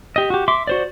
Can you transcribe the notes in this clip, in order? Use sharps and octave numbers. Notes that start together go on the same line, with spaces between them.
G4 D#5
F#4 G4
E5 C6 D6
F#4 C5 D5